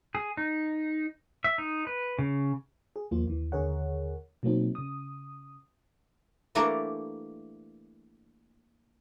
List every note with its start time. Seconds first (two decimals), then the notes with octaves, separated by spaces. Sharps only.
0.15 G#4
0.37 D#4
1.44 E5
1.58 D#4
1.87 B4
2.19 C#3
2.96 G#4
3.11 D#2 F3 A#3 F4
3.27 D#2 E3
3.52 D#2 D3 G#4 A#4 C#5 F#5
4.43 B2 F#3 A#3 C4 D#4
4.75 C#3 D#6
6.55 E3 G3 A3 A#3 D4 A#4